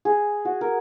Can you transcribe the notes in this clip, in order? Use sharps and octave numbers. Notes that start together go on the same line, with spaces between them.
G#4
F#4
A#4